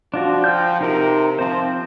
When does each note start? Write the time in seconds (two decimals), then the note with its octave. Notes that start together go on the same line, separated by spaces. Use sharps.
0.14 F3 D4 F4 F#4
0.44 G5 F6 G6
0.81 C3 D#4 A#4
1.39 F3 C4 C5